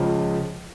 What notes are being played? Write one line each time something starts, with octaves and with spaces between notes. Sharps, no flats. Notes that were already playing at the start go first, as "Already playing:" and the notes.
Already playing: C#2 C#3 F3